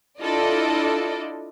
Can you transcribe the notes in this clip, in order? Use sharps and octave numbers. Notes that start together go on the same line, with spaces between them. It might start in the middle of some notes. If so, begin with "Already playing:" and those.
D4 E4 F4 A4 D5 D#5